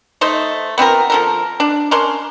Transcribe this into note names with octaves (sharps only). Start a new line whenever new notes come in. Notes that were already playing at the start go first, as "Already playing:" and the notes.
A3 D#4 C5 D#5
B3 C4 F4 A#4
F3 A4 A#4
D4
C#4 D4 A#4 C6